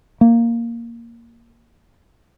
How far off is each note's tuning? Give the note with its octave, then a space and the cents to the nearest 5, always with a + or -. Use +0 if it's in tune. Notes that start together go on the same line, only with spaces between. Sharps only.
A#3 +0